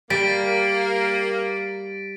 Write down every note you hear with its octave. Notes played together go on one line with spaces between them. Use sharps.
G3 A#3 A6 B6 D7